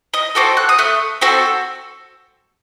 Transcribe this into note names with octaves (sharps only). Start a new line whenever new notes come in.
D#5
C4 F#4 A4 D6
F#6
D#6
A3 F#6
C4 F#4 A4